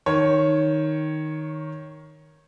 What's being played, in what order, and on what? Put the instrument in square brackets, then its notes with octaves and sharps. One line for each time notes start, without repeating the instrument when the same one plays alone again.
[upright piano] D#3 C#5